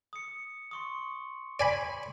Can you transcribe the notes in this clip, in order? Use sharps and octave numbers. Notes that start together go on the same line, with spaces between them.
D#6 C#7
C6 C#6 D#6
D5 G#5 B5